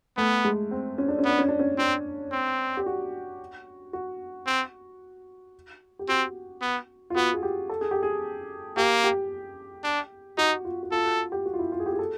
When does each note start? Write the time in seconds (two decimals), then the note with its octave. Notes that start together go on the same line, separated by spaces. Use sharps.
0.17 A3 B3
0.44 G#3
0.71 C4
0.98 C#4
1.08 D4
1.19 C#4
1.25 B3 D4
1.38 C#4
1.48 D4
1.59 C#4
1.78 C4 D4
2.32 C4
2.77 G4
2.86 F#4
3.93 F#4
4.47 C4
5.99 G4
6.09 C4 F#4
6.62 B3
7.10 F4
7.16 B3 F#4
7.34 G#4
7.43 G4
7.70 A4
7.81 G#4
7.91 G4
8.03 G#4
8.77 A#3 G4
9.04 G4
9.84 D4
10.38 D#4 F#4
10.65 F4
10.83 F#4
10.92 F4 A4
11.05 F#4
11.32 G4
11.46 F#4
11.54 F4
11.59 E4
11.72 F4
11.80 G#4
11.86 G4
11.93 G#4
11.99 A4